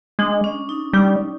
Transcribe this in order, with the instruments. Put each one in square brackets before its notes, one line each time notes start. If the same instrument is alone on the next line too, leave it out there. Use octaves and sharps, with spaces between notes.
[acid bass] G#3 [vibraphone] D4
[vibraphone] C#4
D#4
[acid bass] G3 [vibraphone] D#4